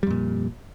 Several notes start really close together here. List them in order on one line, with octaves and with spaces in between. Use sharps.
G3 F2 A#2